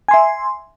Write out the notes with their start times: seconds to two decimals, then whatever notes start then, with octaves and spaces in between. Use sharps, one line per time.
0.08 G#5
0.11 C6
0.14 E5